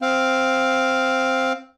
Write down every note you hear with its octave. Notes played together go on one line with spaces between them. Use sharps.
C4 F5